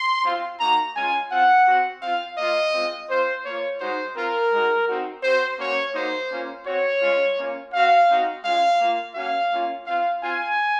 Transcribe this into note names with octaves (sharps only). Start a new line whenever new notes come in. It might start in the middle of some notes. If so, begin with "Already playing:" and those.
Already playing: C6
C4 F4
A#3 D#4 F#4 A#5
G#3 C#4 F4 G#5
C4 F4 F#5
C4 F#4
C4 F4 F5
A#3 F4 D#5
G#3 C4 F4
C4 F4 C5
A#3 F4 C#5
G#3 D#4 F#4 C5
C4 F4 A#4
G#3 D#4 F#4
C4 D#4 F#4
C4 F#4 C5
A#3 C#4 F#4 C#5
A#3 D#4 F#4 C5
A#3 C#4 F4
C4 F#4 C#5
G#3 C#4 F4
A#3 C#4 F4
C4 F#4 F5
C4 D#4 F#4
G#3 C#4 F4 F5
A#3 F4
A#3 C#4 F#4 F5
A#3 C#4 F4
C4 F4 F5
C4 F4 G#5